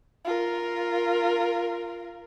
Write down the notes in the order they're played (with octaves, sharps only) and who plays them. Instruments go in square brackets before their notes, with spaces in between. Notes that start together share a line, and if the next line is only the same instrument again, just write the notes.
[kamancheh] F4 A#4